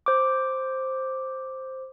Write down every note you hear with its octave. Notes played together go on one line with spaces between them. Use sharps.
C5 D6